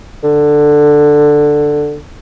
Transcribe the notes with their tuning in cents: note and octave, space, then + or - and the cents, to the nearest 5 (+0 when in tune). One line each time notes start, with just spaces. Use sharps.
D3 +10